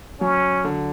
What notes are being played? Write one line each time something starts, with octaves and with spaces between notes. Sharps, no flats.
F#3 C#4
D3